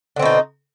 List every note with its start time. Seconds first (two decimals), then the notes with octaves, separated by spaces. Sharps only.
0.16 D3
0.19 C4
0.22 B2
0.25 D#4